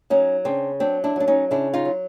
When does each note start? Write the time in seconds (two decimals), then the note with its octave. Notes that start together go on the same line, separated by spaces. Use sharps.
0.10 F#3 C#4 D#4
0.45 C#3 C4 D4
0.80 F#3 C4 D4
1.04 D4 E4
1.16 F#3 D4
1.28 C#4 D#4
1.51 C#3 D4 E4
1.74 D#4 F4
1.85 F#3